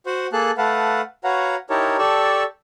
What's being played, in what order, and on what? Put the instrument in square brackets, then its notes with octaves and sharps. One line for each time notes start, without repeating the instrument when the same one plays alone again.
[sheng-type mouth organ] F#4 C5 F#5
A#3 G#4 A4 A5 F#6
A3 B4 F5 F#5 A5
F#4 B4 C#5 F5 F#5 A#5
D#4 E4 G4 A#4 C#5 A5
G4 A4 D5 A5 C#6 E6